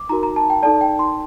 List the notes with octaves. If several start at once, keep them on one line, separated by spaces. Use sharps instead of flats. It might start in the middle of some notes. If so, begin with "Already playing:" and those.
Already playing: D6
D#4 F#4 A#4 A#5
A#5
A5
G5
D#4 A4 D5 A5
G5
C6